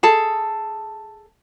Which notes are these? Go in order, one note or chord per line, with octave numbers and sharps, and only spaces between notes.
G#4 A4 A5